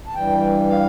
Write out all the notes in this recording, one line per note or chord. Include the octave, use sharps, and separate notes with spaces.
A5
G2 E3 G3 G5
F5